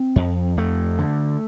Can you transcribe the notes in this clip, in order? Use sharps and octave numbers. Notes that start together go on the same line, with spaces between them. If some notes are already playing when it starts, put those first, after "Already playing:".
Already playing: C4
F2
F2 A3
D3